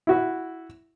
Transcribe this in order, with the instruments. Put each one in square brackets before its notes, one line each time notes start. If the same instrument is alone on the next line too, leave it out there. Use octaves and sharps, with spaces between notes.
[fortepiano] E4 F#4 E5